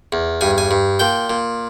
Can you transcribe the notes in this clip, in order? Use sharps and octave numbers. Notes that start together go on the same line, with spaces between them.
E2
G2 G#5
G#5
G2
A#2 G5
A#2